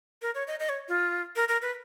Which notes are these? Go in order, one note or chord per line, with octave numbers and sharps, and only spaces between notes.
A#4
C#5
D#5
D#5
C#5
F4
A#4
A#4
B4